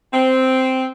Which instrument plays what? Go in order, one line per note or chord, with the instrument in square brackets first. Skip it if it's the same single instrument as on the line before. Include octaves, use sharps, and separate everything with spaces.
[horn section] C4